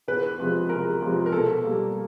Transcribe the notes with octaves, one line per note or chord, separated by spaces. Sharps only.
E2 B4
C3 F3 G#3
E2 A#4
C3 F3 G#3
A#4
B2 A4
G3 A#3